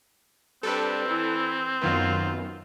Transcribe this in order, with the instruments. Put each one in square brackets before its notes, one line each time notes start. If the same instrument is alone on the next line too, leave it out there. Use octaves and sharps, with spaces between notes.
[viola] G3 D4 [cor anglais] C4 [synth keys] A4 B4
[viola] E3 E4
[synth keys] F#2 D#3 B3 [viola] F4